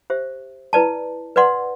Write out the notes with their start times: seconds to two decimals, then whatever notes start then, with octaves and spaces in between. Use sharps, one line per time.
0.10 G4 C5 E5
0.73 E4 B4 D5 A5
1.36 B4 D5 F#5 C6